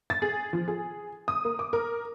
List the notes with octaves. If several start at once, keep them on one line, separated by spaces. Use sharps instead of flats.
A6
G#4
F3
G#4
D#6
A#3
D6
A#4